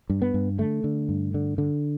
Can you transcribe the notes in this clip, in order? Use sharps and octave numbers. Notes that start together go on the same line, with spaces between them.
G2
B3
G2
D3 A3
D3
G2
D3
D3